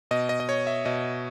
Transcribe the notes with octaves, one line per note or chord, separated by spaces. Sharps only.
B2 D#5
D#5
D#5
C#5
E5
B2 D#5